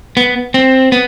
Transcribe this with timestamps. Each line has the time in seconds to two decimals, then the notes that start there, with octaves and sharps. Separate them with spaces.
0.17 B3
0.54 C4
0.92 B3